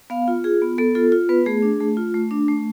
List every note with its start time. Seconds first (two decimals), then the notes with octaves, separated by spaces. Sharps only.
0.10 B3 F5
0.28 F4
0.44 F4 G#4
0.62 B3
0.78 B3 A4
0.95 F4 A4
1.12 F4
1.29 B3 B4
1.46 A3 G#4
1.62 D4
1.80 A3
1.97 F4
2.14 A3
2.31 D4
2.48 A3